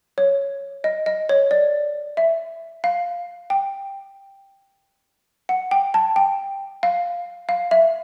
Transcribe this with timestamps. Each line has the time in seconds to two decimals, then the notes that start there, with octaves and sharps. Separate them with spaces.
0.18 C#5
0.84 D#5
1.06 D#5
1.29 C#5
1.51 D5
2.17 E5
2.84 F5
3.50 G5
5.49 F#5
5.71 G5
5.94 A5
6.16 G5
6.83 F5
7.49 F5
7.71 E5